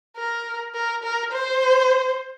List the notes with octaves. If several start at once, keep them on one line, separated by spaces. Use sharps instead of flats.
A#4
A#4
A#4
C5